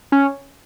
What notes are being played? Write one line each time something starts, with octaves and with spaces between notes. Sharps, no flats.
C#4